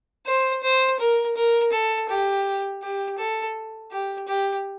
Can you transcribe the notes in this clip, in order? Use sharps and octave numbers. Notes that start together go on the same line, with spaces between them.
C5
C5
A#4
A#4
A4
G4
G4
A4
G4
G4